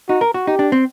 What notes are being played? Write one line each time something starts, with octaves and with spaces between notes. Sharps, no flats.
D#4 F#4
A#4
F#4
D#4 G4
D4
C4